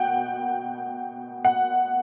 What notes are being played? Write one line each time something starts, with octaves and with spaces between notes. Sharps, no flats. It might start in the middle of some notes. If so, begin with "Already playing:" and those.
Already playing: B2 F#5 G5
F#5